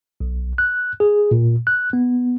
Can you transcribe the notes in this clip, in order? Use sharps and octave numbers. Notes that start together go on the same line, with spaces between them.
B1
F#6
G#4
A#2
F#6
B3